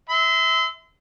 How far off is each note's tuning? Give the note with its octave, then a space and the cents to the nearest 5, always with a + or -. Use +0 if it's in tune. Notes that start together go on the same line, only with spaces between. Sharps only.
E5 -20 C6 -35